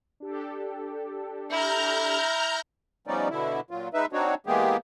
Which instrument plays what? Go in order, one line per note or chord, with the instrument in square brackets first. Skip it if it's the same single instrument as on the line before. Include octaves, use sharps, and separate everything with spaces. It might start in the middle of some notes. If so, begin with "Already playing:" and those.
[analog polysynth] D4 G4 A4
[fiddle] E4 [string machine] A#5 F6 G6
[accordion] F3 G3 B3 C#4 D#4 D5
B2 D3 E4
A#2 F#3 F4
G#3 D#4 B4 E5
C4 D4 D#4 F#4 C#5
E3 G#3 A#3 B3 G4 G#4